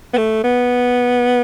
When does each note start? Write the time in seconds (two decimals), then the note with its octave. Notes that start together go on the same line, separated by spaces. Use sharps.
0.14 B3
0.18 A3
0.44 B3